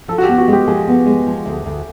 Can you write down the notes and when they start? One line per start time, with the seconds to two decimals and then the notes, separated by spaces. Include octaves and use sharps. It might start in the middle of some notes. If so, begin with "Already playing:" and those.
0.08 F3 A4
0.18 F#4
0.24 G4
0.28 B3
0.38 F#4
0.48 G#3 G4
0.67 F3 G#4
0.88 B3
1.06 G#3
1.26 F3
1.46 D2
1.66 D2